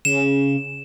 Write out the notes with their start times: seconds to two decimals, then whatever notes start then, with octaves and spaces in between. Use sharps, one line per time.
0.05 C#3 E7